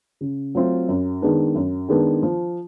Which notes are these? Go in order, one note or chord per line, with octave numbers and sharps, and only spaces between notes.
C#3
F#3 A3 C4 F4
F#2
D#3 G#3 B3 D4
F#2
D#3 G#3 B3 D4
F3